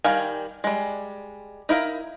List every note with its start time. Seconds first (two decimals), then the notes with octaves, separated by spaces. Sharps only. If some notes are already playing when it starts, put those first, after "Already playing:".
0.04 D#3 G3 F5 G#5
0.64 G3 G#3
1.69 D#4 E4 A#4 F5